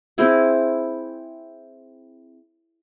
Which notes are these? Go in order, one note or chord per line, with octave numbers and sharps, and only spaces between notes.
C4 E4 G#4